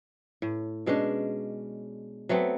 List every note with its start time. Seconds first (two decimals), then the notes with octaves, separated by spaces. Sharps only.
0.42 A2
0.86 B2 G#3 C#4 D4
2.29 F#3 A3 B3 C4